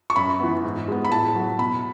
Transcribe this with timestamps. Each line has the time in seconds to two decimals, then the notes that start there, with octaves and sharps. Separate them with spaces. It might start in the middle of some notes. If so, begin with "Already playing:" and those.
0.10 C#6
0.16 F#2 B5
0.40 E3 B3
0.64 G#2
0.88 G#3 B3
1.05 B5
1.12 A2 A5
1.35 F#3 B3
1.59 B2 B5